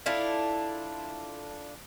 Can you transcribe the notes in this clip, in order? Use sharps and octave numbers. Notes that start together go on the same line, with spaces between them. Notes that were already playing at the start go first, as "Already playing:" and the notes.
D4 E4 F4 A4